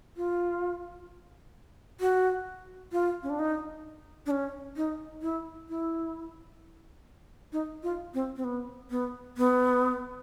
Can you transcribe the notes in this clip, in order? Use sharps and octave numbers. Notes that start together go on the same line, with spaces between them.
F4
F#4
F4
C#4
D4
D#4
D4
C#4
D#4
E4
E4
D#4
F4
C4
C4
B3
B3
B3